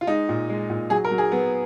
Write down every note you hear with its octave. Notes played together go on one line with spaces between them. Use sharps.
F4
G#3 D#4
A#2
G#3
A#2
F#3 G#4
A#4
F#3
G#4
F#3 B3